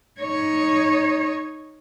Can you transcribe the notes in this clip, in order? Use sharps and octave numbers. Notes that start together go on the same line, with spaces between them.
D#4 C#5